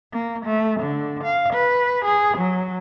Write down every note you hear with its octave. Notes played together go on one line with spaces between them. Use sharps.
A#3
A3
D3
F5
B4
G#4
F#3